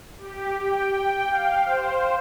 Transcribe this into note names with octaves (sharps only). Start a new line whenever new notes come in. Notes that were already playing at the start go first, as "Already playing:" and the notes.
G4
G5
G5
F5
C5